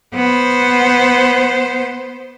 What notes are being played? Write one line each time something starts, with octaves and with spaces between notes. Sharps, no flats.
B3 C5